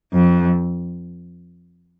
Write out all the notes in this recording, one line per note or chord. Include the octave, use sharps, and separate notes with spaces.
F2